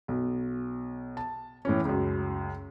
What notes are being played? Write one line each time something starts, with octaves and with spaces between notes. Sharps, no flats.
B1
A5
A2 E3 C#4
C#2 F#2